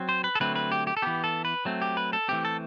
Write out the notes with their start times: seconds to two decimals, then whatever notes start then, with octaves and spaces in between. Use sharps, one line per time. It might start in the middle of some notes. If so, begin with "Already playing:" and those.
Already playing: F#3 C4
0.09 C5
0.24 B4
0.35 A4
0.40 D3 F#3 A3 C4 B4
0.56 B4
0.72 G4
0.87 G4
0.97 A4
1.02 E3 B3 G4
1.24 A4
1.45 B4
1.65 F#3 A3 C4
1.82 G4
1.97 B4
2.13 A4
2.28 E3 A3 C4 G4
2.45 A4